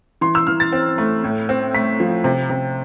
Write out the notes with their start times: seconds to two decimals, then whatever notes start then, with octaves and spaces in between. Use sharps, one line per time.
0.21 E3 C6
0.35 E6
0.47 E3 F6
0.60 A6
0.72 C4
0.98 A3
1.24 A2
1.49 C4
1.74 A3 B6
2.00 F3
2.24 C3
2.50 C3